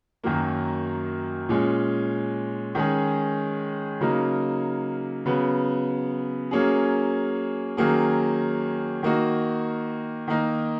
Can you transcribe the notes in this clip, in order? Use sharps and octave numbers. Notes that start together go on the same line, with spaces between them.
F#2 D#3 F#3 A#3
A#2 G#3 C#4
D#3 G#3 C#4 G#4
C#3 F#3 A#3 D#4
C#3 F#3 B3
F#3 A#3 C#4 G#4
D#3 F#3 A#3 C#4 G#4
D#3 A#3 D#4 F#4
D#3 A#3 D#4